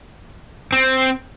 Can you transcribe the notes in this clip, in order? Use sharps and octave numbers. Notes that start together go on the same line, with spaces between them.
C4